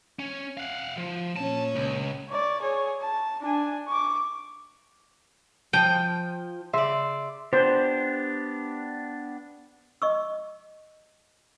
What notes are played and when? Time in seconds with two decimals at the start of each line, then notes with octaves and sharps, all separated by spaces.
0.19 C#4
0.57 F5 F#5
0.98 F3
1.36 A#2 C#4 A5
1.76 C#2
2.30 C#5 D5
2.61 G#4 C#5
3.01 A5
3.41 D4 G#5
3.88 C#6 D6
5.73 F3 G5
6.73 C#3 D5 E5 C6 B6
7.53 B3 D4 G4 C5
10.02 D#5 C#6 E6